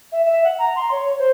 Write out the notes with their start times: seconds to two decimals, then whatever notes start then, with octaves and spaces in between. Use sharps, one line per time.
0.12 E5
0.25 E5
0.44 F#5
0.59 A#5
0.76 C6
0.91 C#5
1.19 C5